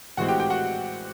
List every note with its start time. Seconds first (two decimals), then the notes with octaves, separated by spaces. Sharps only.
0.17 A2 E3 G#3 C4 F#4 F#5
0.28 G4 G5
0.40 G4 G5
0.50 F#4 F#5